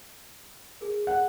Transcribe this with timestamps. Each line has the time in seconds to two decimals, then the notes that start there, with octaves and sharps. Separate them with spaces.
0.81 G#4 A#4
1.07 F#5